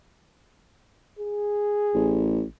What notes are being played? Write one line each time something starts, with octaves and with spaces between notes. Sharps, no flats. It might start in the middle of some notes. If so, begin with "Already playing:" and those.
G#4
A1